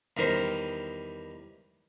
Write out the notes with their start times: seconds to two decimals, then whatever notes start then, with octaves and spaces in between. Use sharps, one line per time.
0.17 E2 D#3 G3 A#4 C5